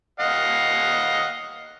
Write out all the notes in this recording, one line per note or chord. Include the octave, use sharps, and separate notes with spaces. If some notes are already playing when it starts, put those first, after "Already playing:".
D#5 F5 F#5